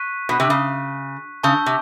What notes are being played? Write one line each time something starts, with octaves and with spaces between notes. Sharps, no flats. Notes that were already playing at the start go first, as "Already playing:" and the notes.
Already playing: C#6 F#6 B6 D#7
B2
C3
C#3
C#3 A5 C#6 E6 G6
C3